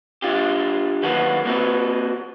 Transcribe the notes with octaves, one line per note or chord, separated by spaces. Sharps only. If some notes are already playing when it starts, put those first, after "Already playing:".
D4 F4 G4
D#3 F#3 A#3 A4 B4 F#5
A#3 C4 F#4 B4